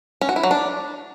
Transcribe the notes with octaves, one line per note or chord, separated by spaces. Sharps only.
C#4
F#4
E4
F#3
D4